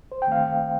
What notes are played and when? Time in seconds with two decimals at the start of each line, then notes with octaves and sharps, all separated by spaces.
0.12 D#2 C5
0.22 G5
0.27 D#3 A3 C4 F5